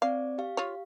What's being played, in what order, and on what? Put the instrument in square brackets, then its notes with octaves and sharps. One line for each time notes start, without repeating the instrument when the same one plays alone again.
[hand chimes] C4 D5 D6 [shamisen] F5
[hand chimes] G4 F5
[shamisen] F4 C#5